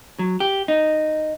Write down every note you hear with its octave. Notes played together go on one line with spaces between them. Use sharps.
F#3
G4
D#4